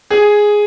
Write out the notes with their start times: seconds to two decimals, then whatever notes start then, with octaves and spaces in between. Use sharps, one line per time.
0.10 G#4